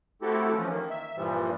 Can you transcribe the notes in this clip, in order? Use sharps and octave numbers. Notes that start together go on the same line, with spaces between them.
A3 C4 E4 F#4 G4 A4
E3 F3 C#4
D#3 A#3
E5
G2 A#2 E3 F3 G3